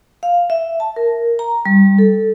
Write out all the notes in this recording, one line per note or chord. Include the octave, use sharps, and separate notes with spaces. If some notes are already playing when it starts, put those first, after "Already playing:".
F5
E5
A5
A#4
A#5
G3
A4